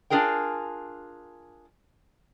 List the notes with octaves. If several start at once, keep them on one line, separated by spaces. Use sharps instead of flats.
D4 F4 G#4 A#4 G5